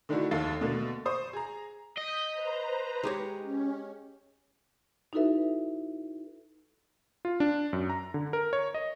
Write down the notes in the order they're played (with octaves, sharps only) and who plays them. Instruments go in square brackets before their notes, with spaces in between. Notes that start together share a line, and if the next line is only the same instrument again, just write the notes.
[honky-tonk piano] D3 D#3 A3 D4 E4 F#4
F1 D#2 A4 F5 A6 C7
B2 D3 A3 A#3
C5 C#6 D#6
G#4 A#5
[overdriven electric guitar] D#5 [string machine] G6 B6
[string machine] B4 C5 A#5
[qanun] G#3 G4 C#5
[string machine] C#4
[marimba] D#4 E4 F#4 A4 B4 E5
[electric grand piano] F4
D4
F#2
A#5
D3
A#4
C#5
D#5